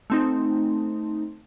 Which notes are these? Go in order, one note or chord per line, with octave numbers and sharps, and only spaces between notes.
A3 C4 D#4